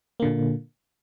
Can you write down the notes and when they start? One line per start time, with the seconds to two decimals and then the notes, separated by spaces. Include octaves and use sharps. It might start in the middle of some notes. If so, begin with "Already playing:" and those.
0.20 A#3
0.22 D3
0.25 A#2